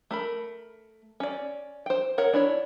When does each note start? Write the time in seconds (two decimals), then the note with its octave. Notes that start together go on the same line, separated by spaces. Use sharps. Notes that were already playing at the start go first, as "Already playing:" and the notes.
0.11 A3 A#4 B5
1.20 C#4 D5
1.86 C5 G5
2.18 A#4 C#5 F#5
2.33 D4 E4 C#5